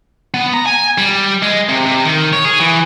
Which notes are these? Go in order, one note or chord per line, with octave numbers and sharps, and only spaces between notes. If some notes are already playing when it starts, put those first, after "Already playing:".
B3
A#5
G#5
G3
G#3
C3
C3
D#3
C#5
G#4
E3